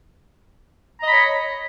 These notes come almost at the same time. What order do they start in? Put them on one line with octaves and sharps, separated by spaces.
A#5 D#5 B5 C#5